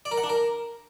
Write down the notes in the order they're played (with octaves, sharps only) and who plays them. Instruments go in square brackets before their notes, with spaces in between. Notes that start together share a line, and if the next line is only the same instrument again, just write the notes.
[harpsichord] D5
A#4
F#5
D4
A#4